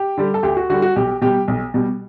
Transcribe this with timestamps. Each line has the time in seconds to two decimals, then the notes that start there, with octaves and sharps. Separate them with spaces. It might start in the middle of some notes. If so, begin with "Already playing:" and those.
Already playing: G4
0.17 D3 G3
0.34 A4
0.43 D2 G4
0.57 F#4
0.69 D3 G3 F#4
0.82 F#4
0.96 B1 G4
1.21 B2 G3 G4
1.48 B1
1.74 B2 G3